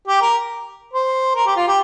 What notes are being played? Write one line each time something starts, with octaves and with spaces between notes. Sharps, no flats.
G4
A#4
C5
A#4
G4
F4
G4